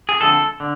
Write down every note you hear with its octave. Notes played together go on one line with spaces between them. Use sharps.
G#4
D3 F3 G#3 C4 A4
D3